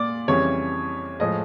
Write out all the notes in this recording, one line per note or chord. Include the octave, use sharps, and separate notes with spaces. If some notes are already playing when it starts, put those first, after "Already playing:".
Already playing: A#2 D5
F2 C#3 E3 G3 C#5
A2 F3 G#3 D#5